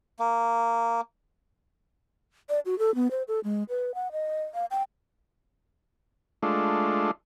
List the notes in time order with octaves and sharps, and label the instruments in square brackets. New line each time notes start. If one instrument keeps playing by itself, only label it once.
[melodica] A#3
[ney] D5
F#4
A4
B3
C5
A4
G#3
B4
F#5
D#5
F5
G5
[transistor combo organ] G#3 A3 D4 F4